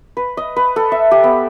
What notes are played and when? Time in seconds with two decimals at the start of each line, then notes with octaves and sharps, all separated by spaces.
0.17 B4
0.37 D#5
0.56 B4
0.76 A4
0.92 E5
1.11 G4
1.24 B3